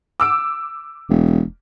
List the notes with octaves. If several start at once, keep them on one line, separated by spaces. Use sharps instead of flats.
D6 E6 D7
E1